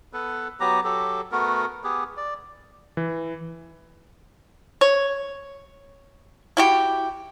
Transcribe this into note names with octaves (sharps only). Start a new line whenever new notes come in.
B3 A4 B4
F#3 B3 G4 A#5
F#3 G4 A4
A3 B3 F#4 A#4
B3 G4 G#4
D5
E3
C#5
E4 F#4 G4